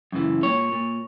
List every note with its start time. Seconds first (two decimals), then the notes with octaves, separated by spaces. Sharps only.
0.12 F#2 C#3 E3
0.42 A#2 C#5
0.72 A#2